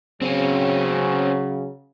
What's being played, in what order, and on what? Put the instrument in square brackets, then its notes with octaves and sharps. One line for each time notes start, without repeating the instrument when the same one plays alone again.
[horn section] C#3 F#3 [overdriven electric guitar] C4 C#4